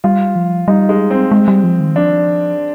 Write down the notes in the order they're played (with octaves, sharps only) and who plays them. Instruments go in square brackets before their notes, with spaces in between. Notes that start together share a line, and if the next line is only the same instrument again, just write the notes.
[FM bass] G3 [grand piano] F4
[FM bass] F3
[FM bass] G3 [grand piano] D#4
[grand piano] G#3
C4
[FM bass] G#3
G3
F3
D#3
[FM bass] F3 [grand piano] D4